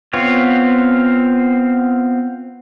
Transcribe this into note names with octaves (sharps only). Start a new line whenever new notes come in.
B3 C4 F4 C#5